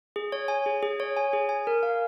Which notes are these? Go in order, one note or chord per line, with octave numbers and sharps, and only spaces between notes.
G#4
C#5
G#5
G#4
G#4
C#5
G#5
G#4
G#5
A#4
F5